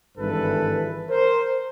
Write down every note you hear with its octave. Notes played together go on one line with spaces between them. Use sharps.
G#1 G2 E3 A4 B4
A#4 C5